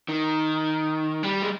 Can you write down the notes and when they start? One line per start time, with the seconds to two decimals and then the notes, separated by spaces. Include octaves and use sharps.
0.08 D#3
1.23 G3
1.43 G#3